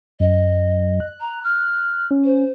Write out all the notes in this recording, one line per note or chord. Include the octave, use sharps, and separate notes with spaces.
F#2 D#5
F#6
A#5
F6
C#4
C5